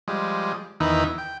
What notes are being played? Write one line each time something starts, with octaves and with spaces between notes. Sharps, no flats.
F3 G3 G#3
E2 D#3 E3 D#4 B4 E5
G5